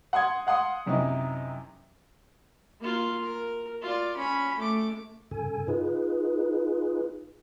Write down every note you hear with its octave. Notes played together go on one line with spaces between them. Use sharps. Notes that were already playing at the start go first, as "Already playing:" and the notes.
F#5 C6 D#6 G#6
F5 F#5 C6 D#6
F#2 C3 C#4 D#4 E4
A#3 F4
A#4
F4 D5
C#4 B5
A3 D6
G2 C#3 A4 G#5
D#4 F4 G#4 B4